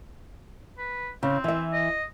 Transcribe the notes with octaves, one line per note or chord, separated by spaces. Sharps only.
B4
C#3 C4
E3 E5
D#5